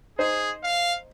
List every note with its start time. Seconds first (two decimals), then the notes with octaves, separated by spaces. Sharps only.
0.19 D#4 G#4 C5
0.63 F5